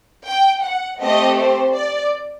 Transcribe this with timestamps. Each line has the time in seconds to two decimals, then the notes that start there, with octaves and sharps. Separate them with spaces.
0.25 G5
0.63 F#5
1.00 A3 C4 G4 D#5
1.37 C5
1.75 D5